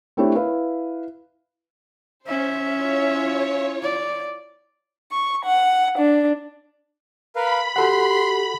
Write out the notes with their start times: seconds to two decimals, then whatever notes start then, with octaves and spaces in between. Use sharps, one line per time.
0.17 A3 C4 D4 E4 G4 C#5
0.35 E4 B4 F5
2.27 C#4 C5 E5
2.78 E4 F4 C#5
3.83 D5
5.11 C#6
5.45 F#5
5.97 D4
7.35 A#4 B4 F5 B5
7.76 F#4 G4 A4 F#5 C6